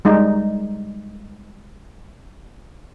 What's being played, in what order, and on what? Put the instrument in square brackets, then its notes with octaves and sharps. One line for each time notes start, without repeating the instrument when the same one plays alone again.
[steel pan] G3 G#3 D#4